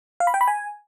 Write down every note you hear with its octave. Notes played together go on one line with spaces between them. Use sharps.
F5
B5
G5
B5
G#5